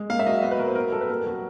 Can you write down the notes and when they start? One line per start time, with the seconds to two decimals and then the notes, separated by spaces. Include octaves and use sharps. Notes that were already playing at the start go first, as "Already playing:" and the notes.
Already playing: G#3
0.10 A#3 F5
0.19 E5
0.26 F#3 D#5
0.42 B3 D#5
0.51 B4
0.59 F#3 A#4
0.68 C5
0.75 B3 A#4
0.92 G3 A4
1.01 B4
1.09 A#3 A#4
1.26 F#3